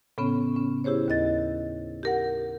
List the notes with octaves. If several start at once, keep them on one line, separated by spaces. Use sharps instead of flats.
A2 C#3 B3 C#4
C#4
E4 G4 G#4 C5 C#5
D#2 A#4 D#5 A6
G4 A#4 F#5